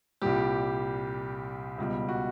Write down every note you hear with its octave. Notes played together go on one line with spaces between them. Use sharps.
C2 A#2 G3 G4
C#2 B2 G3
F#4